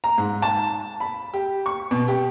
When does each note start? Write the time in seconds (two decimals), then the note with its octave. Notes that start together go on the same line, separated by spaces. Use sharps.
0.04 A#5
0.18 G#2
0.42 A5
1.00 B5
1.34 G4
1.66 C#6
1.91 B2
2.08 G4